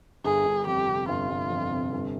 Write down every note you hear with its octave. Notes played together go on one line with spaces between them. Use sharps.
G1 G#4
G1
F2 G4
C3
G1 F4
G1
F2
C3
G1